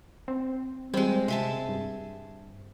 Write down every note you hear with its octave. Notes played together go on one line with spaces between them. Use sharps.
C4
G3 G#3 C4
C3 G#4 E5 A5
G2